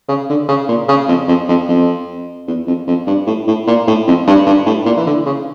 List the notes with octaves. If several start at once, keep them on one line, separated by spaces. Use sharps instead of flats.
C#3
D3
C#3
A#2
C#3
F2
F2
F2
F2
E2
F2
F2
G2
A2
A2
A#2
A2
F2
G2
G2
A2
A#2
E3
D3
C#3